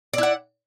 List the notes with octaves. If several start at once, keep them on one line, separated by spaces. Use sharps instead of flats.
E4 D5 F#5